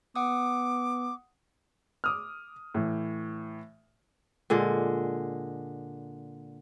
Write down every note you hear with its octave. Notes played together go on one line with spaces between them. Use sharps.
B3 F#5 D6 D#6
D6 D#6 F6
A2 E3
A#2 D3 G#3